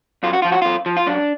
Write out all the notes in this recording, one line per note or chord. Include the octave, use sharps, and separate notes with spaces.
F#2 F4
F#4
F3 F4
F#4
F#2 F4
F3
F4
F#2 D4